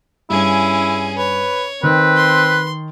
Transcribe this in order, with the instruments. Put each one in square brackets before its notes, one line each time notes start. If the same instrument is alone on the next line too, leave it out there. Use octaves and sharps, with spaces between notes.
[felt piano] G2 [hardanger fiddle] C#4 G#4 [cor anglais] E4
[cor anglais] B4 [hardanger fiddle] C#5
[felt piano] D#3 [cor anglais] C4 [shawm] B4
[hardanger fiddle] C6